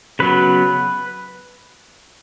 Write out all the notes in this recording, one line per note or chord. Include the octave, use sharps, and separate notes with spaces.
C#3 F#3 B3 B4